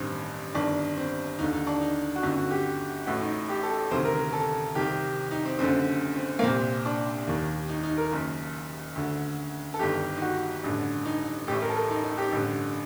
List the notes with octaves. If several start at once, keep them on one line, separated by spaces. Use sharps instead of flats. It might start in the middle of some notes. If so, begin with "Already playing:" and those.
Already playing: A1 G2 D#3 C4
G1 G2 D#3 D4
C4
D#2 D3 D#4
D#4
D4
D#4
F#4
G1 F#2 D3 D#4
F#4
G4
A1 A2 F#4
D#4
G4
A4
D2 C3 D#3 C5
A#4
A#4
A4
C2 C3 D#3 G4
D#4
C4
F#1 F#2 D3 C4
C4
A#3
C2 A#2 C4
D4
D#2 D#3
D#4
D#4
A#4
F#1 F#2 D#3
D2 D3
A4
G1 G2 D#3 G4
D#4
F#4
A1 G2 D3
D#4
A1 A2 G4
A#4
A4
A#4
D#4
D#4
G4
A1 G2 D3